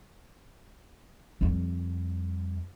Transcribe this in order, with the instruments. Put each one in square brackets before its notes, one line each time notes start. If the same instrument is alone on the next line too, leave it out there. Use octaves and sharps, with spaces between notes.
[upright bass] F2 G3